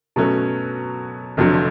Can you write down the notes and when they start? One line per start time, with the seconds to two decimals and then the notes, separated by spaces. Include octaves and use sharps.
0.16 B2 F#3 A3 C#4
1.37 F1 F2 D3 F#3